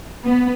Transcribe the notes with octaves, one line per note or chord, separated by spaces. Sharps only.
B3